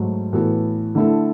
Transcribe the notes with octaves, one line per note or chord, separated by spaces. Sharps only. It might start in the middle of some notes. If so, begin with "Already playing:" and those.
Already playing: G#2 F#3 A3
A2 E3 B3 F#4 A4
D3 A3 E4 A4